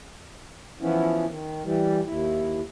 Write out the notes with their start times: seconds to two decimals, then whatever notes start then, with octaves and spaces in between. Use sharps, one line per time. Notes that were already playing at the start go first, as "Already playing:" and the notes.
0.81 E3 F3 B3 C#4 E4
1.27 D#3
1.63 E3 G3
2.06 D#2 E4